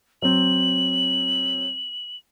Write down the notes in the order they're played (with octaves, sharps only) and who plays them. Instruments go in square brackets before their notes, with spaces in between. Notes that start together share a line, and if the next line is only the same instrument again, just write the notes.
[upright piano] F#3 C4 [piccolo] F#7